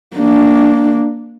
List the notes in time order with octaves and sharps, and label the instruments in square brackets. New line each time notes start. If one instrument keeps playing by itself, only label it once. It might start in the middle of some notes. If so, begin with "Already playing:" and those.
[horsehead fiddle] A#3 D4